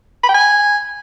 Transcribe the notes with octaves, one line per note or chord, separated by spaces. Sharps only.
B5
G5
G#5